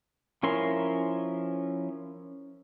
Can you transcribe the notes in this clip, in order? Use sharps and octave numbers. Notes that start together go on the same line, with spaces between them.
F3 C#4 E4 A#4 C6